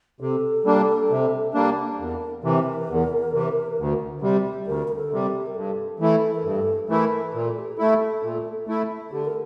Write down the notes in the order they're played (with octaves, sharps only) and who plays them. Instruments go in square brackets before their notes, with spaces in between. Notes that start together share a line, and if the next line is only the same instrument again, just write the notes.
[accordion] C3 [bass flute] A4
[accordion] G3 A#3 D4
C3
G3 A#3 D4
[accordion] E2 [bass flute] A#4
[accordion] C3 E3 [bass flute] A#4
[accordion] E2
C3 E3
D2
C3 G3
[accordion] D2 [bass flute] A#4
[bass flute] A#4
A4
[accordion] C3 G3
[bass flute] G4
A#4
[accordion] G2 [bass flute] A4
[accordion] E3 A3 E4 [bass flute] A4
[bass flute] A#4
[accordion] G2 [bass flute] A4
[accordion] E3 A3 E4 [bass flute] A#4
[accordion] A#2 [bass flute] A#4
[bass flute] A4
G4
A4
[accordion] A3 E4
A#2
A3 E4
[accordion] D3 [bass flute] G4
[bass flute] A#4